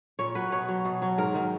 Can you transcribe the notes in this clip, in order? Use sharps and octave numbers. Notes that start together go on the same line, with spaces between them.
A#2 C#5
F#3 B4
B2 C#5
F#3
B2
F#3
G#2 A#4
D#3 F#3